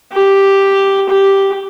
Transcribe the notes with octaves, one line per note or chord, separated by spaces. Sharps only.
G4
G4